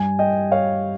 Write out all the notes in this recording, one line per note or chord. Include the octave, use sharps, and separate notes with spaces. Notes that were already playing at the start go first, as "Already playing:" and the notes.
Already playing: G2 G3 G#5
D#5 G5
C#5 F5